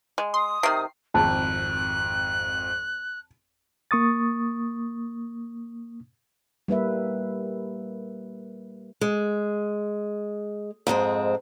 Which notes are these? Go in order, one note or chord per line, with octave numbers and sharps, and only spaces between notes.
G#3
C6 D#6
C3 D#3 C7
G#1 F2 A5 F#6
A#3 C#6 D#6 A6
G3 A#3 B4 E5
G#3
F2 G#2 G#3 C4